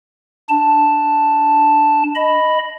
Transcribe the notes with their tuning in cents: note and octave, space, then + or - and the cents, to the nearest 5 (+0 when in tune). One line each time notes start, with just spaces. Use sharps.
D4 +0 A5 +0
D#5 +0 B5 +0